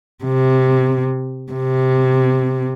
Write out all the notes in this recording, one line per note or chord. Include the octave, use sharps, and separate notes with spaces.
C3
C3